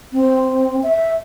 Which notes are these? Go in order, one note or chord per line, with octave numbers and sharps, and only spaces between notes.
C4
E5